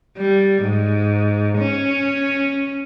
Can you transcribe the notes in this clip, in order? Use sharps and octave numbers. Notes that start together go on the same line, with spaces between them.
G3
G#2
C#4